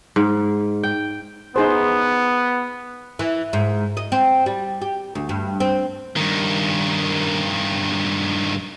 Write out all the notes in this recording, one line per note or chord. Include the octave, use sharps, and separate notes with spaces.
G#2
G5
B3 D#4 G#4 C5
E3
G#2
D#5
C4
G3
G4
D2
G2
C4
G2 D#3